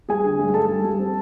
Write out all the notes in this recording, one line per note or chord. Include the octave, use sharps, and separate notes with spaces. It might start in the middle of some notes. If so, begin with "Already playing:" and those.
G3 G#4 G#5
D3
G2
G2 A4 A5
G3
G3
C4